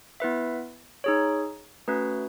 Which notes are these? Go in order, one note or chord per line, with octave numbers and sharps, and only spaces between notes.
B3 E4 B4 E5
D#4 G#4 C#5
A3 C#4 F#4 B4